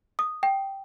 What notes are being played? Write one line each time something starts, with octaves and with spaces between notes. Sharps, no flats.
D#6
G5